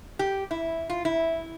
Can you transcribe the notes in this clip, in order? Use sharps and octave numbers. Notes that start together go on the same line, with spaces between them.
G4
E4
F4
E4